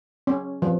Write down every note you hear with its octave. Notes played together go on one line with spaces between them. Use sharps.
C#4
F3